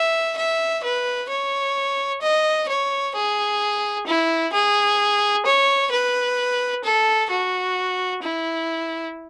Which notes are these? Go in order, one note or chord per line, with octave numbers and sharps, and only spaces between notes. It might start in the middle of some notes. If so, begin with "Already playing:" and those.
Already playing: E5
E5
B4
C#5
D#5
C#5
G#4
E4
G#4
C#5
B4
A4
F#4
E4